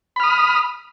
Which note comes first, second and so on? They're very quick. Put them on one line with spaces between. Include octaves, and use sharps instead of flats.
B5 F6 D#6